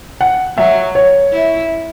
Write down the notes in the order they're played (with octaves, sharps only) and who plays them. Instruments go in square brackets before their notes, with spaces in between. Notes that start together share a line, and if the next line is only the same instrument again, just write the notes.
[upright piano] F#5
[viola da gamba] F#3 [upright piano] E5
[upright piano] C#5
[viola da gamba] E4